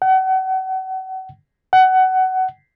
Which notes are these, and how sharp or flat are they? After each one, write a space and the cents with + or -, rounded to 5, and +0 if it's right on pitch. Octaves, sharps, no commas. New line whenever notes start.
F#5 +35
F#5 +20